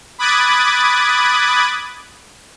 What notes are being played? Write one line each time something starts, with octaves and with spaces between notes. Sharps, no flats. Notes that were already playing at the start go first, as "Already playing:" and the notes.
B5 D6 D#6 F#6 G#6 A6